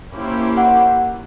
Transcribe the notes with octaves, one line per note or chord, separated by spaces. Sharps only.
A#3 C#4 E4 G4 C5
F#5